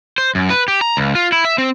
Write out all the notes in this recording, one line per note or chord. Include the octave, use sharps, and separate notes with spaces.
C5
F#2
B4
G4
A#5
C#2
F4
E4
E5
C4